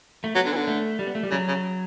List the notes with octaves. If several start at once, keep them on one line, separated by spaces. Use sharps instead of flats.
A3
F#3 B3
D3
E3
D3
A3
G3
B3
A3
G3
C#3 F#3
C#3